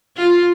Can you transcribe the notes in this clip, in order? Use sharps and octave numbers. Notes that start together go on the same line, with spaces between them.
F4